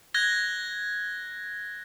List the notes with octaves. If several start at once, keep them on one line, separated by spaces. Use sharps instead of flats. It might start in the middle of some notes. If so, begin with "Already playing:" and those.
F#6 G#6 A#6 G7